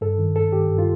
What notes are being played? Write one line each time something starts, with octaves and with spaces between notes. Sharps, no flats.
G2 A4
D#3
G2 A4
D#3 G4
G2
F4